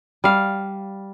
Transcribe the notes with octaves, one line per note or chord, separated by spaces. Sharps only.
G3 F5